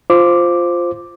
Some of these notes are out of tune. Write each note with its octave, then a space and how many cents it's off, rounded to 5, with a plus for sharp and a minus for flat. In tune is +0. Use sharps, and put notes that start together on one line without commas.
F4 +0 C5 +0 D6 +0